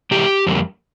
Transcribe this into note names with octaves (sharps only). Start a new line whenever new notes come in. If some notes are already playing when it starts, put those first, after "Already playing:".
C3 E3 G#3 G4
F2 D3 G3 A#3